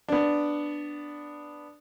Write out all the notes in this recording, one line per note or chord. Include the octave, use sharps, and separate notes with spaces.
B3 D4